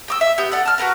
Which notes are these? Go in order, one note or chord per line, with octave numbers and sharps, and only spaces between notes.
G5 D6 E6
E5
B3 G4 G6
A4 D5 F#5
A5 F6
F#4 G4 A#4 B4